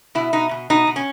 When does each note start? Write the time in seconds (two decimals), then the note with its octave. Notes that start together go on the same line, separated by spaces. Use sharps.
0.15 B2 E4
0.33 B2 D#4
0.51 B2
0.70 B2 D#4
0.87 B2
0.96 C#4